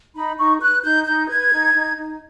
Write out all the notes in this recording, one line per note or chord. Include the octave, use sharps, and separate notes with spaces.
D#4 B5
D#4 C#6
B4 F#6
D#4 G6
D#4 G6
B4 G#6
D#4
D#4
D#4